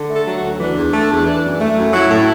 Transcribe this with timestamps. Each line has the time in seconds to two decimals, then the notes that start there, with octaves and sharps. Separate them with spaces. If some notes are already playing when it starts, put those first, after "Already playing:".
Already playing: D3
0.10 A3
0.15 A4
0.26 F#3
0.37 F#4
0.43 D2
0.60 E3 D4
0.76 E2
0.93 A3
1.10 E2
1.26 E3
1.43 F#2
1.60 A3
1.77 F#2
1.93 F#3 E4
2.10 A2